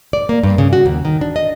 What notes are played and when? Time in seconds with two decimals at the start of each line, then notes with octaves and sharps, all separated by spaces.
0.13 D5
0.29 A#3
0.43 G2
0.58 C#3
0.73 F#4
0.86 D#2
1.05 D#3
1.21 D4
1.36 D#5